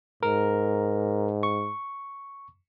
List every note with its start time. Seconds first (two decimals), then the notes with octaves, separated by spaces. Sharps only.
0.23 G#2 A#4
1.43 C#6